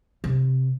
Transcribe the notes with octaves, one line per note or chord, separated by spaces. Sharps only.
C3